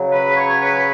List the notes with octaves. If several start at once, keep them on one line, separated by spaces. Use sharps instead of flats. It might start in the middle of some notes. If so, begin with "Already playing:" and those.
Already playing: C#3 F#3
B4
C#5
B4